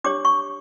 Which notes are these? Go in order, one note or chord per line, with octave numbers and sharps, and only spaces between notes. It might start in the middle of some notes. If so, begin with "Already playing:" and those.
D4 G4 C#5 D6
C#6